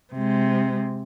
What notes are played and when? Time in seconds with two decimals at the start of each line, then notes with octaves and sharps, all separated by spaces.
0.14 C3 G#3